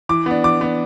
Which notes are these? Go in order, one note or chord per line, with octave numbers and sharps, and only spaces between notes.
E3 D6
B3 D4
E3 D6
B3 D4